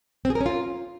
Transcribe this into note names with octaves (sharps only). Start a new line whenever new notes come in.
C4
G#4
A#4
C#4
F4